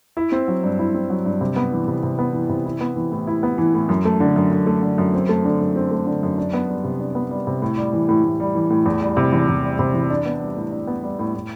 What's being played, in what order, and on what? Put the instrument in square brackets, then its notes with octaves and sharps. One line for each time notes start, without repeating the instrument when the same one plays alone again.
[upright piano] E4
C4
F#3
G2
E4
C4
F#3
G2
C3
B3
E3
C3
C3
B3
E3
C3
E4
B3
E3
A2
E4
B3
E3
A2
F#2
A3
D3
F#2
F#2
A3
D3
F#2
C4
A3
D3
F#2
C4
A3
D3
F#2
D4
B3
G3
C3
D4
B3
G3
C3
A2
G3
E3
A2
A2
G3
E3
A2
E2
G3
C3
E2
E2
G3
C3
E2
D4
B3
G3
A2
D4
B3
G3
A2
A2